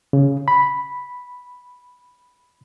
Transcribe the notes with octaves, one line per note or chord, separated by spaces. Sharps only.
C#3
B5